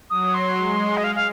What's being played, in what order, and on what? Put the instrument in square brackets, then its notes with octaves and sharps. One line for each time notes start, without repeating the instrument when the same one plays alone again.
[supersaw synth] F#3 [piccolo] D#6
[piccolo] C6
[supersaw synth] G#3
[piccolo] D#5
F5
F5